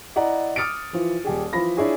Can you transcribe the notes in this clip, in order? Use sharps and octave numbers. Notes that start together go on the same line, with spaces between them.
E4 D5 D#5 F#5 A#5
D6 D#6 F6 A6 C#7 D7
E3 F3 F4
D#1 G4 G#4
E3 F3 F4 B5 A#6
D4 E4 F4 G#4 C#5 G#5